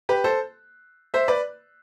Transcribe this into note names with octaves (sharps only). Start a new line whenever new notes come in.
G4 B4
A4 C5
C5 E5
B4 D5